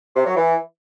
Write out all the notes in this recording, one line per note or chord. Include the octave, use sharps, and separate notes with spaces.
C3
F#3
E3